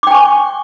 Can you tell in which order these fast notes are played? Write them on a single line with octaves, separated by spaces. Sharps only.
D6 G5 G#5 C#6